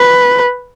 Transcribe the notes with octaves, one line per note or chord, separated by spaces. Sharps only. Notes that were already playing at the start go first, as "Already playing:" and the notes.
Already playing: B4